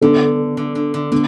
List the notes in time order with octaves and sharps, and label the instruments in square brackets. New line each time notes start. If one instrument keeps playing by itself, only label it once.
[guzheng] D3 [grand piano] B3 D4 A4
[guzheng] D3
D3
D3
[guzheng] D3 [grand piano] B3